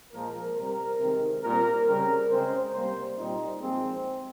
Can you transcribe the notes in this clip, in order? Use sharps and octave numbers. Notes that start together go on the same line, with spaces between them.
A#2 F3 G#3 A#4
C3 G3 C4 A#4
C3 D#3 G#3 C4
A#2 G3 C4 A#4
C#3 G3 C4 A#4
C#3 G#3 C4 C5
C3 G3 A#3 C5
A#2 G3 C4 D#4
A#2 F3 G#3 C4